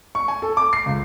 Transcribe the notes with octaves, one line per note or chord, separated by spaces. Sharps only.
C#6
G#5
A4
D6
C7
C#2